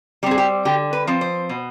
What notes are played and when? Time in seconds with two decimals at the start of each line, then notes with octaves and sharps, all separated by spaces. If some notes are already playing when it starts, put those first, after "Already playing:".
0.23 G3 G4
0.26 C4 G#4
0.38 G4
0.65 D3 G4
0.93 B4
1.07 F3 C4
1.21 C5
1.49 B2